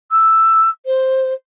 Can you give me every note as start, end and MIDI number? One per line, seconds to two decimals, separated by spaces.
0.11 0.69 88
0.86 1.33 72